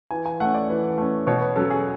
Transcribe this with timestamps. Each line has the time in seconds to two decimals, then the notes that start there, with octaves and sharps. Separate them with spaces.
0.11 E3 G#5
0.26 G#5
0.40 A3 C#4 F#5
0.54 D5
0.69 E3
0.98 A3 C#4
1.27 B2 C#5
1.41 B4
1.56 F#3 C#4 A4
1.70 G#4